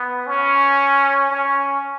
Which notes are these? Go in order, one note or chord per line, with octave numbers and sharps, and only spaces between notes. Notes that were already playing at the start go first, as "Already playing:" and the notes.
Already playing: B3
C#4
C#4